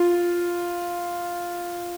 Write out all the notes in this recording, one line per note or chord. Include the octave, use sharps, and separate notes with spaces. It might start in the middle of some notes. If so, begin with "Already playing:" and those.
Already playing: F4